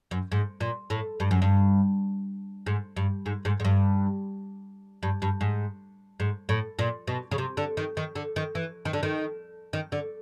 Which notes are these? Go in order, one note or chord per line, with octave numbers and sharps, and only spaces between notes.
F#2
G#2
A#2
A2
G2
F#2
G2
G#2
G2
G#2
G#2
G#2
G2
G2
G2
G#2
G#2
A2
A#2
B2
C#3
C3
D3
D#3
D#3
D3
D#3
E3
D#3
D3
D#3
D#3
D3